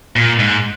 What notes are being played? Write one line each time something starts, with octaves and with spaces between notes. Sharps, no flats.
A#2
G#2